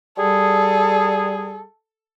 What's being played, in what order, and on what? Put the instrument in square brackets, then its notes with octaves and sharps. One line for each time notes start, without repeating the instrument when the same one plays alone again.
[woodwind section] G3 G#4 [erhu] A4